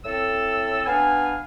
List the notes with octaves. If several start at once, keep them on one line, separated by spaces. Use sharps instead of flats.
A2 C4 A4 E6
B3 D4 F5 G#5